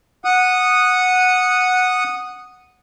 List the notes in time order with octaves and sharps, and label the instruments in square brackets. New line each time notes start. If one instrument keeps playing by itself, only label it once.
[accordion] F#5 D#6